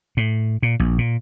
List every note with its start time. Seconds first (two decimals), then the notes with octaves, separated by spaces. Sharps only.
0.17 A2
0.63 A#2
0.80 A#1
0.98 A#2